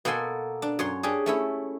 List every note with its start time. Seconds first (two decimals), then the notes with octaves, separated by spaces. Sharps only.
0.05 B2 A#3 B3 A4 G#5 C6
0.62 D4
0.79 F#2 C#5 C6
1.03 C#4 D4 G4 G#4
1.26 A3 C#4 E4